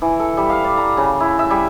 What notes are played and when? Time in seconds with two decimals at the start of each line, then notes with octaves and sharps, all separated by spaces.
0.02 E3
0.19 A4
0.37 G3
0.50 F5
0.64 D5
0.77 A#5
0.97 C#3
1.20 E4
1.39 E5
1.50 G3